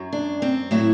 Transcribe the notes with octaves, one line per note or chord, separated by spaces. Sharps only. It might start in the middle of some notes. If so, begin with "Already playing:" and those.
Already playing: F#2 F#3
D4
C4
A2 F#3 E4